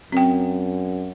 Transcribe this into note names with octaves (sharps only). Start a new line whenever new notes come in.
F#2 C4 G5